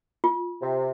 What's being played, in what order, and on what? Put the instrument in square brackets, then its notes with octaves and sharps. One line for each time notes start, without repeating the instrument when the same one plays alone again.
[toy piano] F4
[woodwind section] C3